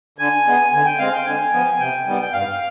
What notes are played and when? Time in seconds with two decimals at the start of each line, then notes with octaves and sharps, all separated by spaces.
0.19 D3 G#5
0.46 G#3 B3
0.72 D3 G#5
0.86 G5
0.99 G#3 C4 F5
1.13 G5
1.26 D3 G#5
1.53 F3 B3
1.79 C3 G5
2.06 D#3 G3 B3
2.21 G5
2.33 G2 F5